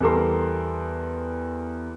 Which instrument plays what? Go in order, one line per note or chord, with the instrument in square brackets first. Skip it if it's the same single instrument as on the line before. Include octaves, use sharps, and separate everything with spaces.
[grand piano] E2 G3 A4 A#4 C6